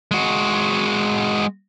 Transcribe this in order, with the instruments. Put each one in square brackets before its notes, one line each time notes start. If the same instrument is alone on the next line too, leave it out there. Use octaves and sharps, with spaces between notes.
[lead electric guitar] G#3 F#4